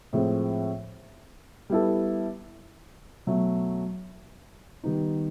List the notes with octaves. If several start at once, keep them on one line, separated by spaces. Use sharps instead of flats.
A2 F3 G#3 C4
G3 B3 E4 A4
B2 F#3 A3
D#3 G3 B3 D#4